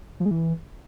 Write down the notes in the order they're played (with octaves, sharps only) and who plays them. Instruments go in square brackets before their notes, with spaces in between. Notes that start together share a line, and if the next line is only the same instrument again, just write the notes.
[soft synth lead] F3
G#3
E3